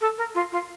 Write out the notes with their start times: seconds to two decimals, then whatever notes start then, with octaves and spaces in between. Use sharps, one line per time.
0.01 A4
0.18 A#4
0.35 F4
0.52 F4